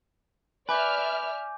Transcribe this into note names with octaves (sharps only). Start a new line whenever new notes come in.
B4 D5 E5 G#5 D6 F6 G6